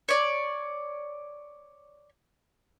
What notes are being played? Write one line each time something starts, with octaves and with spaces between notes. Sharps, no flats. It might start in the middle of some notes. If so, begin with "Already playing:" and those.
C#5 D5